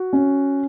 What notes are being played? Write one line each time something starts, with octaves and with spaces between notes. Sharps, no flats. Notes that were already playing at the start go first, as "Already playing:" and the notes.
Already playing: F#4
C#4